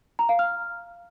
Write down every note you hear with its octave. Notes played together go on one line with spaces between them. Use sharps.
A#5
F5
F6